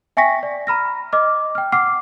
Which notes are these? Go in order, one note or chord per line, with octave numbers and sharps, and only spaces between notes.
E5 G5 G#5 C#6 A#6 B6
D5
A#5 B5 F6 A#6
D#5 D6 F6
G5 F6
F#5 D6 F6 C7